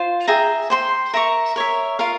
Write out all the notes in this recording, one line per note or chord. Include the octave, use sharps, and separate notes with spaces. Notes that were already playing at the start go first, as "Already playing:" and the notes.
Already playing: F4 C5
G#4 E5 G5 A#5
C5 G5 C6
A#4 E5 A#5 C#6
A#4 C#5 E5
F4 A#4 F5